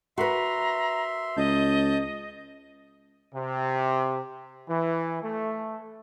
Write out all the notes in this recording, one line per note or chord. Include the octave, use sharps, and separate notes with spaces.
F#4 A#4 B4 E5 A#5 C6
C#2 D#5 A5 G6
C3
E3
A3